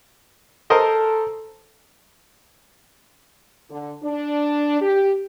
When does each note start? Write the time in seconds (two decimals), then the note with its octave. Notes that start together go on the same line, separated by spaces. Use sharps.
0.70 A4 A#4 C5 D#5
3.70 D3
4.03 D4
4.81 G4